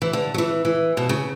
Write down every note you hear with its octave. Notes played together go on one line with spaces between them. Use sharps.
E3
D3
F#3
E3
E3
B2
C#3